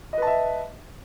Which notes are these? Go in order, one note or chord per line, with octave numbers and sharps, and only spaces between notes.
B4 D#5 E5 A5